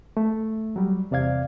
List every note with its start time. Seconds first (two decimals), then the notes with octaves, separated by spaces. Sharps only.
0.17 A3
0.76 F#3 G3
1.11 E2 C3 D5 F5 G#6